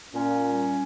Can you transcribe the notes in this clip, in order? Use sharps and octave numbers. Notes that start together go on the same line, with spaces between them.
A#2 C#4
G3